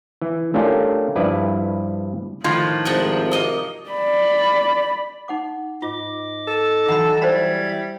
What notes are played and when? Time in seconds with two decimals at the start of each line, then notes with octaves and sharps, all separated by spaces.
0.22 E3
0.54 A3 C#4 D4 F4 G4 A#4
1.16 G2 F3 E4 B4 D5
2.44 A2 D#3 F3 F4
2.85 G#1 C3 D4 D#4 F#5
3.31 A#3 D#5 D#6
3.90 D5 B5
5.28 D#4 F#5 D6
5.82 G#2 F4 D#5 D6
6.48 A4
6.88 E3 F#3 D#4 D#5 F#5 A5 B5
7.22 G3 C5 E5 B5 G#6